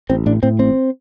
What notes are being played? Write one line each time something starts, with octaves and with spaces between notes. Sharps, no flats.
A1 C4
A2 D4
A2 C4
A1 C4